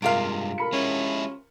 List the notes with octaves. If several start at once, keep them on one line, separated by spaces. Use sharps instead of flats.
G2 C3 G#3 F4 A#4 F5 D7
A#4 B5 C#7
G#3 C#4 E4